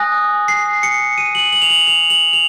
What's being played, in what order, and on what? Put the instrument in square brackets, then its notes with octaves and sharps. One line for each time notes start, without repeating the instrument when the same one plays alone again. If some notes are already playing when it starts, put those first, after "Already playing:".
Already playing: [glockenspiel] G#5 D#6 F#6 A#6
C7
C#7
D#7
F#7
F#7
F7
F#7
F7
F#7
F7